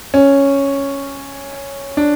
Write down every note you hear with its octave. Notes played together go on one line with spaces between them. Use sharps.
C#4
D4